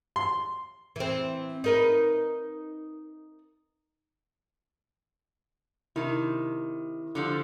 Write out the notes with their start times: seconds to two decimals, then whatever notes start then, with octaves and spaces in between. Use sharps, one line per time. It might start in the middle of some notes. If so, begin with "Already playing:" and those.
0.16 C6
0.96 E3 C4
1.64 D#4 A#4 B4
5.96 C3 D#3 E4
7.15 D3 F3 G3